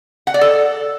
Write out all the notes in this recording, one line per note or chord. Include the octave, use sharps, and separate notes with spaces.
F#5
D5
A4